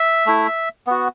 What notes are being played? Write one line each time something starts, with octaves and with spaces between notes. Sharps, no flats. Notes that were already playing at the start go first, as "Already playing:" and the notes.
Already playing: E5
A3 E4
B3 F#4